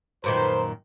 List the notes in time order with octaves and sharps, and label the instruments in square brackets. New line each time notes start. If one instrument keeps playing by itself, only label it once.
[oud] F#2 A#2 D#3 [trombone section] B4 C5